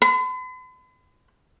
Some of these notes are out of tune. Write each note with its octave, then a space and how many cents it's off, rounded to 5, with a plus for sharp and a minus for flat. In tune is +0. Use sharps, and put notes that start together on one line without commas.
B5 +45